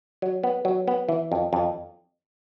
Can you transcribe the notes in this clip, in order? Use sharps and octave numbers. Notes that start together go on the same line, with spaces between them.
F#3
B3
F#3
B3
E3
F2
F2